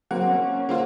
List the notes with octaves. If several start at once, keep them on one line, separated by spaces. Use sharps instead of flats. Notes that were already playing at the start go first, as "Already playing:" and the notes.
F#3 A#3 C4 F#5
C#4
A#3 C4 F4